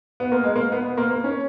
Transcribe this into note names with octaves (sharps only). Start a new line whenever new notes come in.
B3
A#3
G#3
A#3
B3
B3
A#3
A#3
C#4